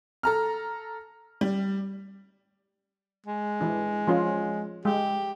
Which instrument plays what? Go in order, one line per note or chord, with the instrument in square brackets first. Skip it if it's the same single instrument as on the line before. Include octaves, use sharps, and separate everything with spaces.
[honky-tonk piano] A4 A#5 F6
G3
[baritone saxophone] G#3
[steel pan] E3 D4
F3 C#4 F4
[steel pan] G#3 [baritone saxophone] G4